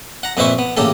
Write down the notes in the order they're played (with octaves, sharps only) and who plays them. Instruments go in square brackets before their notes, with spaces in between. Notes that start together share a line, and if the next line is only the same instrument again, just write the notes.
[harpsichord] F#5 A#5
F2 A#2 B4 C5 E5 C#6
B3
A1 C#3 A#3 G4 A4